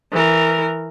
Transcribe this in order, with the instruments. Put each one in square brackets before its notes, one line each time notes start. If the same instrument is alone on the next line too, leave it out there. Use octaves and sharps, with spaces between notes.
[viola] E3 A#4